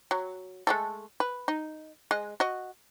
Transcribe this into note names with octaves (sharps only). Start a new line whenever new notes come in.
F#3
G#3 A3 A4
B4
D#4
G#3 D#5
F#4 D#5